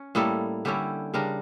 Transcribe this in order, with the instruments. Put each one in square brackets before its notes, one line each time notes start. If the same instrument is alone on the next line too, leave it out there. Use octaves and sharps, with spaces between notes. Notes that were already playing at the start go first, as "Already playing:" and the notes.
Already playing: [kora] C#4
A2 G3 A#3 E4 A4
D3 G3 C#4 E4 G4
C#3 G3 D4 A#4